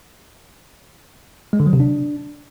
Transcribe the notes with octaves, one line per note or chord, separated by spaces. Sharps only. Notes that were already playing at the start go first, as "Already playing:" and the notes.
G#3
D3
F#3
C3
D4